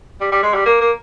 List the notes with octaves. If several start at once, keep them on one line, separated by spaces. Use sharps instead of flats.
G3
G3
G#3
G3
A#3
A#3